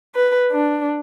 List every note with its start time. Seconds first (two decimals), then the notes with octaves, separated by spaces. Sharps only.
0.15 B4
0.51 D4